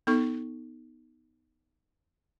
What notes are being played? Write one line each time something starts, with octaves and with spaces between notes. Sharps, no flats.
B3 D#4 A4 C#6